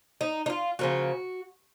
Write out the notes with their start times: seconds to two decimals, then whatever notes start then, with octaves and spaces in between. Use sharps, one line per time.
0.21 D#4
0.46 D#4
0.50 F4
0.79 C#3 F3 A#3 F#4